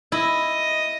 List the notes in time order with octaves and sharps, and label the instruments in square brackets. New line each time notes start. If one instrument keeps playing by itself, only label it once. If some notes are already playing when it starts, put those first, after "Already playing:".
[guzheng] E4 [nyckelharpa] D#5